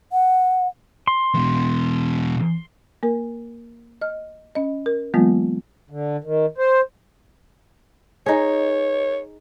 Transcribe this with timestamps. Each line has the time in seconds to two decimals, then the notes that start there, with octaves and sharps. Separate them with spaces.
0.12 F#5
1.07 C6
1.34 E2 B2
3.03 A#3 A#4
4.02 D#5 F6
4.55 C#4 D#5
4.86 A#4
5.14 E3 F#3 G#3 A#3 B3 F4
5.90 D3
6.24 D#3
6.58 C5
8.26 D#4 G#4 C#5